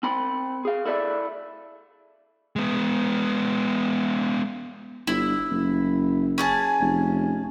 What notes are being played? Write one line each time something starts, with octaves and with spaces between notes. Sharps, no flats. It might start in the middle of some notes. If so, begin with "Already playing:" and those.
C4 B5 C6
G#4 F5
E4 A4 D5 E5
G#3 B3
G1 E4
F#1
C#4 G#4 A5
F1